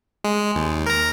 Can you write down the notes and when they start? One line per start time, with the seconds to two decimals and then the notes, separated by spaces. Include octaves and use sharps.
0.24 G#3
0.55 D#2
0.86 A#4 A#5